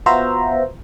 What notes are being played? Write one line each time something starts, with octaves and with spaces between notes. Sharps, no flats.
B3 F4 F#4 C5 E5 A#5